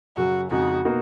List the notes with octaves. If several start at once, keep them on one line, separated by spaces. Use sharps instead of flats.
F#2 C#3 F#3 F#4
F2 C#3 G#3 D#4 F#4
B2 A#3 D#4 F#4